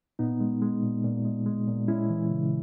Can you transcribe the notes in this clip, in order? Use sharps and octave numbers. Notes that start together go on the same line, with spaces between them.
A#2 B3 D#4
G#3
G#3
A#2
A#2
G#3
G#3
A#2
G#3 C#4 E4
E3
C#3